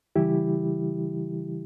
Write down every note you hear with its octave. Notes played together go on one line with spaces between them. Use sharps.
C#3 E3 G3 E4 G4